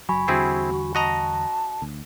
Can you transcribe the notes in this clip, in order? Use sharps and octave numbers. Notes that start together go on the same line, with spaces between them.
F#1 F#3 G#5 B5 C#6
E2 D3 G3 C4 E4 F#4 G#4
F#4 D#5 A5 A#5
D2